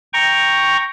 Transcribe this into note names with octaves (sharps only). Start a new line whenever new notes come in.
G5 A#5 C#6